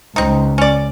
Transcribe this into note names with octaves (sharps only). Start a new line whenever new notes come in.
C#2 C4 D#4
C#4 D5